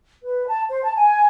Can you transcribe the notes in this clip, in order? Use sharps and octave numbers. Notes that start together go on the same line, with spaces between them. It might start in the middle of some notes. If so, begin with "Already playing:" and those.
B4
A5
C5
A5
G#5